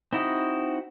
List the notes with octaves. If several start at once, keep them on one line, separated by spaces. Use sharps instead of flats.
C4 D#4 E4 F#4 D#5